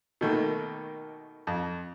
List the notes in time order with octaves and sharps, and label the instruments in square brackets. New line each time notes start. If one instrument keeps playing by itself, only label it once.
[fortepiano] B2 D#3 A3 A#3
F2